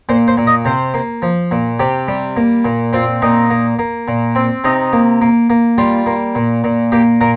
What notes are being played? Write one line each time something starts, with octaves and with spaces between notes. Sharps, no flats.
A#2 C5
C5
A#2
D#5
C3 C5
A#3
F3
A#2
C3 G4
G3
A#3
A#2
C4 F4
A#2 D#4
A#3
A#3
A#2
C4
C3 D#4
A#3
A#3
A#3
G3 F4
A#3
A#2
A#2
A#3 G4
A#2 A#4